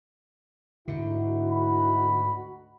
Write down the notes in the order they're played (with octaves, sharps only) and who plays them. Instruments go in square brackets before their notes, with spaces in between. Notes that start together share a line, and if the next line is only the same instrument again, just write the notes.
[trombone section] D2 D#4 F#4 [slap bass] G#2 D3 [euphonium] E4
[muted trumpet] B5